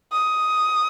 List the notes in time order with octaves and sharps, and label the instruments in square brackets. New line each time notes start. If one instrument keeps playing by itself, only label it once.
[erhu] D#6